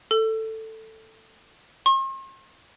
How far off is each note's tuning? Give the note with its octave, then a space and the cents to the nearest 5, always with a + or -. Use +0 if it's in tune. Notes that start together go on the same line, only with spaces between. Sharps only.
A4 +10
C6 +45